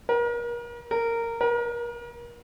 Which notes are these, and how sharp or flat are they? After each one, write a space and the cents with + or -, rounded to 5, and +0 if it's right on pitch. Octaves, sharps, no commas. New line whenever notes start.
A#4 +35
A#4 -15
A#4 +35